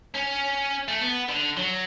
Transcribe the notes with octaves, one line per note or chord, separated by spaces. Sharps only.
C#4
A3
B3
D3
F#3